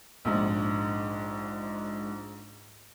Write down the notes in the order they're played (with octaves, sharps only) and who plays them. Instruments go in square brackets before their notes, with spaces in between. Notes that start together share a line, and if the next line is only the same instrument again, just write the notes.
[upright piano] A#1 G#2